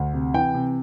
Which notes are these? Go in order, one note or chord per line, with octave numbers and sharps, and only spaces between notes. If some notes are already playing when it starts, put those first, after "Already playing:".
Already playing: D2
C3
E3 G5
C3